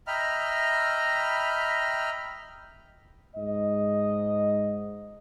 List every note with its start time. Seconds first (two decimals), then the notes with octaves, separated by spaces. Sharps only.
0.07 D#5 E5 G5 A#5 B5 F6
3.36 G#2 D#5